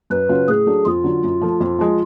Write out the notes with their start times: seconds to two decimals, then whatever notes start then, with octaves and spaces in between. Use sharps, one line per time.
0.10 F#2 B4
0.29 C#3 F#3 C#4 F4
0.48 A2 G#4
0.66 F#3 A3 D4
0.85 F2 F4
1.04 D3 F#3
1.24 F#2
1.41 F3 A3
1.60 F2
1.79 F3 G#3